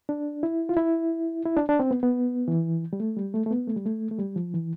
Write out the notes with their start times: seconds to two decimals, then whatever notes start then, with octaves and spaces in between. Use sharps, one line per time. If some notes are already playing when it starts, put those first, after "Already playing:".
0.09 D4
0.43 E4
0.69 F4
0.77 E4
1.46 E4
1.56 D4
1.69 D4
1.80 C4
1.91 B3
2.03 B3
2.48 E3
2.93 G3
3.00 A3
3.16 G3
3.34 A3
3.46 A3
3.50 B3
3.68 A3
3.76 G3
3.86 A3
4.11 A3
4.19 G3
4.36 F3
4.54 E3